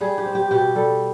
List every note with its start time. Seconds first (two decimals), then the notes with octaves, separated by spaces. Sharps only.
0.01 G3 G#4
0.18 G4
0.26 C4
0.35 G4
0.51 B2 G4
0.76 G3 A4